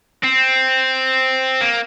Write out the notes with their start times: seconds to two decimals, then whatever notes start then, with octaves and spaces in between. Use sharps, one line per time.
0.24 C4
1.61 A#3